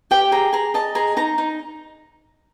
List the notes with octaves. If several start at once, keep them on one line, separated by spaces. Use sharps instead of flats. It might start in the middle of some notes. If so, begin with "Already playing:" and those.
G4 G5
G#4 A#5
G#4 A#5
D#5 A5
G#4 A#5
D#4 A#5
D#4